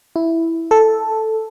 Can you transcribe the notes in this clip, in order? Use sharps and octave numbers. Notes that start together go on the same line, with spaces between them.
E4
A4